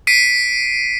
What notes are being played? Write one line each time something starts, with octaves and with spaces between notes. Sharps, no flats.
B6 C7 D7 D#7